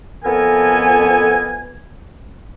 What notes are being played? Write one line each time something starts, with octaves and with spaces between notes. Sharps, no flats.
F2 B3 A4 A#4 G#5